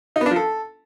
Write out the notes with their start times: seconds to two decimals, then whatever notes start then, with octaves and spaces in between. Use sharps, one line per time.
0.16 D#4
0.21 B3
0.26 D4
0.31 F3
0.36 A4